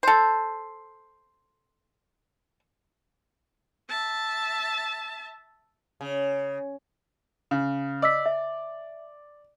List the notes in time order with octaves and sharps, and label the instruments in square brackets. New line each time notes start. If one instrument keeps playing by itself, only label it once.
[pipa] A4 C5
[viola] E5 A5
[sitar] C#3
[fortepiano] C#3
[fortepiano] D5 [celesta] D#5 E6 B6
[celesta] E5